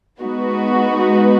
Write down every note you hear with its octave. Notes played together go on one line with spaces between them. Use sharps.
G#3 B3 D#4 F#4 B4